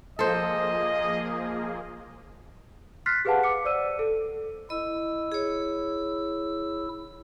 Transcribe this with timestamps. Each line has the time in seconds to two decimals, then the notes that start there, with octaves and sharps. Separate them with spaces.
0.19 F3 A#3 G#4 A4 C5 D#5
3.06 C6 F6 F#6 A6 B6 C7
3.25 G4 G#4 B4 F5 F#5 A5
3.43 D6 C#7
3.65 C5 D5 E6 D#7
3.99 A4
4.70 E4 D#5 E6
5.32 G#4 C#5